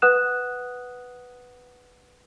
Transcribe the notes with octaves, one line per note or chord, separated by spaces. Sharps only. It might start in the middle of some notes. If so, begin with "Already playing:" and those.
B4 F#5 D#6 F#6 E7